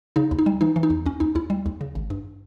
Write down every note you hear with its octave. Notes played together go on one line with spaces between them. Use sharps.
C#3 D#4
D#2
D#4
G3
E3 D#4
E3
D#4
E2
D#2 C#4
D#2 D#4
D#2 E4
G3
D#2
C#3
G#1
G2